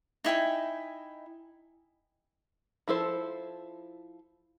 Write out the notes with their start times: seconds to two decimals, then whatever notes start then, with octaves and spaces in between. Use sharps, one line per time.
0.24 D#4 E4 G5 G#5
2.88 F3 E4 A4 C5